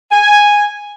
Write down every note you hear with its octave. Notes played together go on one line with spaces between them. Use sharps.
G#5